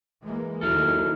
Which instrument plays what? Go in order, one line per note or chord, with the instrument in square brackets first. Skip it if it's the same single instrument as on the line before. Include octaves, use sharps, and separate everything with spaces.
[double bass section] E3 G#3 A#3
[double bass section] D#2 D#3 [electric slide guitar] F#3 E4 A4 [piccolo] F6